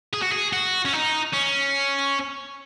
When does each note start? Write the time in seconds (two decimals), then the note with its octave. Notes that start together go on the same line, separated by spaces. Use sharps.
0.14 G#4
0.23 F#4
0.32 G#4
0.53 F#4
0.85 C#4
0.93 D#4
1.33 C#4